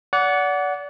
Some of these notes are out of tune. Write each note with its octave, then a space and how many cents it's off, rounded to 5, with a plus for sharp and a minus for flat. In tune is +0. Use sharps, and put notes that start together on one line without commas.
D5 -35 F#5 +0